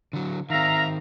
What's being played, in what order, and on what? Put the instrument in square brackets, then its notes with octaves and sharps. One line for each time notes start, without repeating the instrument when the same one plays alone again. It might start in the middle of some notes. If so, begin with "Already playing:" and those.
[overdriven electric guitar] D3 F#3
[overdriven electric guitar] D#3 C4 [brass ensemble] E5 F5 A#5